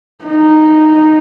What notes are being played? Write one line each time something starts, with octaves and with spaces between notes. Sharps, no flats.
D#4